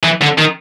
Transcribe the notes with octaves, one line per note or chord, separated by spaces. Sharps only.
E3
D3
D#3